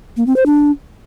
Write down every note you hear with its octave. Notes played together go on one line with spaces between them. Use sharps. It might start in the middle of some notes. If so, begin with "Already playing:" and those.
A#3
C4
C5
D4